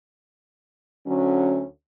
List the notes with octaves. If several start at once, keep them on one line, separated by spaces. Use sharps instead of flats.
D2 D3 F#3 C#4